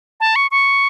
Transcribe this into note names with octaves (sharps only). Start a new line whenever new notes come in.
A5
C#6
C#6